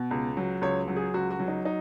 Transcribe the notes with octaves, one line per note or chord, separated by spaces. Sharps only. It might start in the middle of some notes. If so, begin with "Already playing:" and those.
Already playing: B2
C#2
F#3
C#2 C#5
F#3
G#4
C#2 F#4
F#4
F#3
D#4
D#4